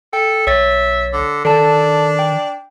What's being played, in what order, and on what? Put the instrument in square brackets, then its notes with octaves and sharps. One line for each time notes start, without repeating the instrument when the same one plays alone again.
[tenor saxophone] A4 [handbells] G5
[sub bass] B1 [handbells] C#5 A6 [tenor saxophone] E5
[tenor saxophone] D3
[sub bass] D#3 [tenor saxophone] D4 [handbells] A4 A5
[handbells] G5